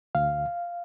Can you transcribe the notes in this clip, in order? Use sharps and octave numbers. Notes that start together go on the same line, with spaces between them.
D2 F5